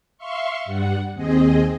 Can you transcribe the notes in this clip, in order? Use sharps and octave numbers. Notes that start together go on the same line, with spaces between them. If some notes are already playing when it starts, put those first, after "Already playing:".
E5 F5 C6 C#6
G2 G3 F#5
D#2 C4 G#4 D#5